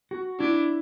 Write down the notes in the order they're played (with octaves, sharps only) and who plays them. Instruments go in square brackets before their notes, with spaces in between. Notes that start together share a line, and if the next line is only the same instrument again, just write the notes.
[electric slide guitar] F#4
[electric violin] D4 [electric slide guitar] E4